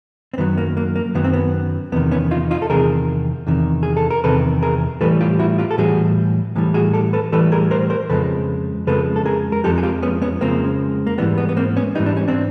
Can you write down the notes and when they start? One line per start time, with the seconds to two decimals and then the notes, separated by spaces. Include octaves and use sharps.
0.34 C4
0.38 F#2 D#3 F#3 B3
0.58 A#3
0.77 A#3
0.96 A#3
1.15 F#2 D#3 F#3 B3
1.24 C4
1.33 B3
1.92 E2 C3 D#3 B3
2.11 B3 C#4
2.31 D#4 F4
2.51 D#4 F4
2.62 A4
2.70 E2 C3 D#3 G#4 A#4
3.47 E2 C3 D#3
3.83 G#4
3.97 A4
4.11 A#4
4.24 E2 C3 D#3 A4 B4
4.62 G#4 A#4
5.01 A2 E3 G3 A4 B4
5.21 F4 G4
5.39 E4 F#4
5.58 F4 G4
5.71 A4
5.78 A2 E3 G3 F#4 G#4
6.55 A2 E3 G3
6.74 F#4 G#4
6.93 G4 A4
7.13 A4 B4
7.32 A2 E3 G3 A4 B4
7.52 G#4 A#4
7.71 A#4 C5
7.90 A#4 C5
8.10 F2 C#3 F3 G#3 A4 B4
8.87 F2 C#3 F3 G#3 A4 B4
9.16 A4
9.26 G#4 A#4
9.52 A#4
9.64 F2 C#3 F3 G#3 G4 A4
9.78 G#4
9.83 F4 G4
10.03 B3 C#4
10.22 B3 C#4
10.41 F2 C#3 F3 G#3 A#3 C4
11.07 A#3
11.18 G#2 E3 G3 B3
11.38 B3
11.49 B3
11.57 A#3 C4
11.76 B3 C#4
11.95 G#2 E3 G3 D#4
12.06 D4
12.17 C#4
12.28 C4 D4